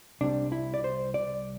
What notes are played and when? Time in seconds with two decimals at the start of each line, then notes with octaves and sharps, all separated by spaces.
0.21 C2 C3 G3 D4
0.52 E4
0.74 D5
0.84 C5
1.14 D5